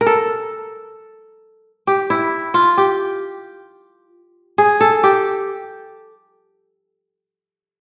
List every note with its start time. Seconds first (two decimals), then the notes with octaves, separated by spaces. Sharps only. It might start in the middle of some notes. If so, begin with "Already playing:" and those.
0.01 A#4
0.07 A4
1.87 G4
2.10 E4
2.54 F4
2.78 G4
4.58 G#4
4.81 A4
5.04 G4